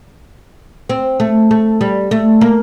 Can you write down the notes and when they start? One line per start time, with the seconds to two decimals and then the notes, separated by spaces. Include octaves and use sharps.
0.90 C4
1.20 A3
1.51 A3
1.81 G3
2.11 A3
2.41 A#3